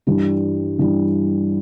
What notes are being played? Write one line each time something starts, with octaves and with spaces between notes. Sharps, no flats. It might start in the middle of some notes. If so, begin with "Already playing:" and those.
G2 E3 G3
G2 E3 G3